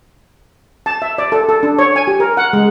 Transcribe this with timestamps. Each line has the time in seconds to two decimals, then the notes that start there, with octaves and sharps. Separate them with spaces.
0.86 A5
1.02 E5
1.18 D5
1.32 A4
1.49 A4
1.63 D4
1.79 C#5
1.96 G#5
2.07 G4
2.20 A#4
2.37 F#5
2.53 G#3